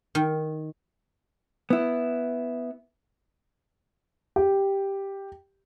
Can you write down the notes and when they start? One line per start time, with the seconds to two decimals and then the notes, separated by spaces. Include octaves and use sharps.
0.15 D#3
1.70 B3 E4
4.36 G4